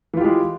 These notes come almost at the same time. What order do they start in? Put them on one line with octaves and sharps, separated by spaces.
E3 F4 G4 G#3